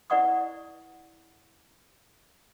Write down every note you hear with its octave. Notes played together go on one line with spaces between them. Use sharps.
E4 B4 D5 F#5 C#6 D#6